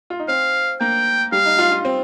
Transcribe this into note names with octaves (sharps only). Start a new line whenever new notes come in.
F4
D#4
C4 F5
A#3 G5
G3 F5
D#4
F4
F4
C4